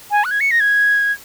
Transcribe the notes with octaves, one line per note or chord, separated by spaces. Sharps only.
G#5
F#6
G#6
C#7
A#6
G#6